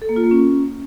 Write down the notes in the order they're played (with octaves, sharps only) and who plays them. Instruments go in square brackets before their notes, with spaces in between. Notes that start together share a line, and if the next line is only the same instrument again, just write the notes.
[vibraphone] A4
A#3
F4
A#3
C#4